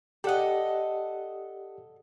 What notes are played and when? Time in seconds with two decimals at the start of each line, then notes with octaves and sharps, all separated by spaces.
0.24 G4 A4 D5 D#5 F#5